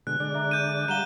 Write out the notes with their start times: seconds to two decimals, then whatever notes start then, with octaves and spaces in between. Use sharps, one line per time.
0.07 B2 D3 G#3 F#6
0.20 D3 G#3 D5
0.35 E5 A#5
0.51 G6 D#7
0.88 G3 F5 F#5 A#5 D#7 E7 G7